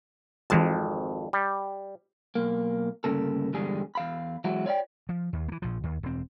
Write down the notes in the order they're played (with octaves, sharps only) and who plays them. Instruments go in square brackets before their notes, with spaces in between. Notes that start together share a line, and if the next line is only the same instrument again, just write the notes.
[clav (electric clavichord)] G#1 F2 [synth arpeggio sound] E3 G#3 A5
[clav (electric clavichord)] G3
[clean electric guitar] B1 A#3
D2 G2 C#3 A#3 A4
E2 G2 D3 G3 G#3 G#4
E2 F5 B5
E3 F#3 G#3 E4 F#4
C#5 D5 E5 G5
[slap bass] F3
D#2
E3 A#3
A#1 F3
D#2
E1 C4